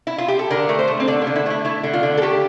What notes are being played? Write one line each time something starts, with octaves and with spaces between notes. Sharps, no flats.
E4
F4
G4
A4
D3 A#4
A3
C5
A3
C4
D3 D4
A#3
D3
E4
A3 E4
A3 E4
D3
F4
D3
A4
A3 G4